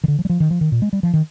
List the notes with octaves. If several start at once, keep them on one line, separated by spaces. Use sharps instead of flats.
D#3
D3
F3
G3
F3
D#3
F3
D#3
A#2
G#3
G3
F3
D#3